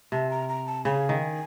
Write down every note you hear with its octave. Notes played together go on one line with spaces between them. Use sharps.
C3 A5
A#5
A#5
A5
C#3 G#5
D#3